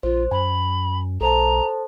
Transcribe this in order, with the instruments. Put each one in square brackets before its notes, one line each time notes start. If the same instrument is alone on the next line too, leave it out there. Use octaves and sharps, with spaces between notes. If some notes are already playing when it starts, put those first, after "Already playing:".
[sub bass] A#1 [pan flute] F4 [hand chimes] C5
[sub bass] F#2 [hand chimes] G#5 [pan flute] B5
[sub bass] B1 [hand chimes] A4 C5 A5 [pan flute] A#5